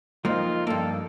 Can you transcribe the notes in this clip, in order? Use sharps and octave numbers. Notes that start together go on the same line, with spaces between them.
F2 F3 A#3 D#4 F4
G2 A#3 A4